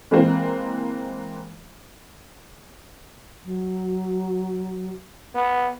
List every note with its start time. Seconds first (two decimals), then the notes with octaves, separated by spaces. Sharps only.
0.11 E3 G#3 A#3 C4
3.45 F#3
5.35 B3